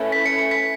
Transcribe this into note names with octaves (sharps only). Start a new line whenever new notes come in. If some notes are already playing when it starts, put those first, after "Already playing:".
Already playing: A3 C#4 E4 B4
B6
C#7
C#7
B6